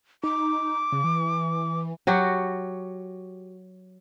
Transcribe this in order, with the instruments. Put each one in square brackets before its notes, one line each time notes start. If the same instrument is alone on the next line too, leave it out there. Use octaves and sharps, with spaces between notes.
[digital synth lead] D#4 [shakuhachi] D6
[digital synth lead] C#3
E3
[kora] F#3 F#4 G4